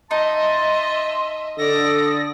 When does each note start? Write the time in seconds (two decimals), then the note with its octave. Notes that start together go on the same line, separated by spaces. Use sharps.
0.11 D#4 D#5 E5 A5 C6
1.58 D3 A4 D5 D#6 A#6